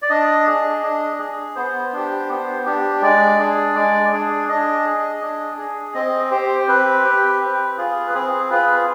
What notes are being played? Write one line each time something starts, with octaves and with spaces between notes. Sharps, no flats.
D5
D4 D#5
G#4
D4
G#4
B3 C5
D4 G4
B3
D4 G4
G#3 D5
D4 G#4
G#3
D4 G#4
D4 D#5
G#4
D4
G#4
C4 D#5
G4 C5
C4 B4
G4
C4
F4 G#4
B4
C4 G#4
F4 G#4 B4